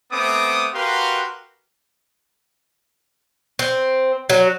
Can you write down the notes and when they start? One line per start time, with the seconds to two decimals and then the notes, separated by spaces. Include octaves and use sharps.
0.12 A3 B3 C4 D6 D#6
0.74 F#4 G4 A#4 B4 F5 C6
3.59 C4
4.30 F#3